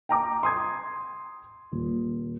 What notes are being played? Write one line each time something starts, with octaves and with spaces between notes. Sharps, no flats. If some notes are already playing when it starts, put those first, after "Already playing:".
G5 A#5 D6
C6 D#6 G#6
D#1